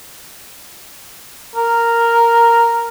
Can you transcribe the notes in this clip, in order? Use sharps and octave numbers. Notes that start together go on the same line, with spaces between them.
A#4